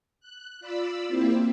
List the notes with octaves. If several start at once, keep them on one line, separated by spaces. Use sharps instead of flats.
F#6
F4 D5 B5 E6
A#3 C4 E4 G4 C5